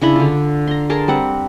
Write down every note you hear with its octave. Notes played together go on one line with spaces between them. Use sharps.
C#3 D4 E4 B5
D3 F4
A#5 C6
G#4 A#4 A5 C6
G3 C4 F#5